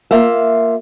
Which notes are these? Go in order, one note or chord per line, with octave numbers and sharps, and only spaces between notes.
A#3 F4 E5